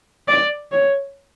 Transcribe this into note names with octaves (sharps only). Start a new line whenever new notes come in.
D5
C#5